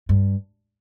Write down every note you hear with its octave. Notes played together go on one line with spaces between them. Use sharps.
G2